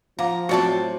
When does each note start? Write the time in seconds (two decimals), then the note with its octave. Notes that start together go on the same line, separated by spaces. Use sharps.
0.19 F3 F5 F#5 A#5 D6
0.49 A2 C3 F#3 C4 F#4 D5 A5